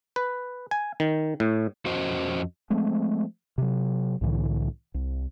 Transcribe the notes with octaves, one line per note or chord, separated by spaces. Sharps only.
B4
G#5
D#3
A2
F2 C#4 F#4 C5 D#5
F3 G#3 A3 C4
C3 F#3
C2 A2 D3 E3
C2